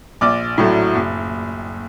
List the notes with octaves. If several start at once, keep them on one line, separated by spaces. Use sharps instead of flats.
A#1 D5 D6
A2 F#3 A3
F#1